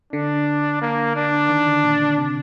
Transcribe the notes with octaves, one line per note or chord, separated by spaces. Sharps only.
D3 D4
A#3
D4
D#3
D3
A#2
D3
C3